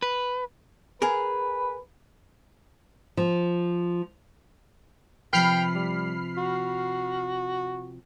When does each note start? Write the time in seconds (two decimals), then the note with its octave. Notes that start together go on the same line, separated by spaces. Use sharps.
0.02 B4
1.02 G#4 A#4 B4
3.17 F3
5.33 C3 F3 B4 G5 B5 F6 C7
5.75 G3
6.37 F#4